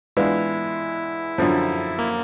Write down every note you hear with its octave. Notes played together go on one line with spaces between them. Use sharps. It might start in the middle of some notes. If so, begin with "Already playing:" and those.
E3 G#3 B3 D4 E4 F4
F#2 D3 F3
A#3